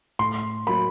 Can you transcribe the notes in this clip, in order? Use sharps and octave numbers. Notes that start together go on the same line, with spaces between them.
A2 C6
F#3 A#3 B5